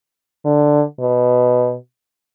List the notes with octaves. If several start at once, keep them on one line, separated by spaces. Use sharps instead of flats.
D3
B2